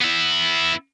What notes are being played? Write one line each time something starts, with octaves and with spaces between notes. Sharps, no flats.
B3 E4